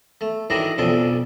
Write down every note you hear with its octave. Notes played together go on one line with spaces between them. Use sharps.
A3
A2 D#3 E3 F#3 D4 A#5
B1 F2 C#3 D4 A4